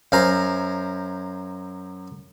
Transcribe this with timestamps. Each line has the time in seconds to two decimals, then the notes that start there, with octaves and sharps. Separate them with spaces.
0.12 F#2 C5 F5 G#5 A#5